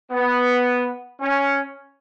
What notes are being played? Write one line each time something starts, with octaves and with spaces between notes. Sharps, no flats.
B3
C#4